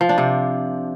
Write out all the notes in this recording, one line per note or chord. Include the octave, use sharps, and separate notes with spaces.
F3
D4
C3